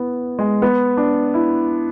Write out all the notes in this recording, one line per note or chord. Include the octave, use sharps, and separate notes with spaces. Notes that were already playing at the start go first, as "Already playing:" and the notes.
Already playing: B3 E4
G#3
B3
D4
E4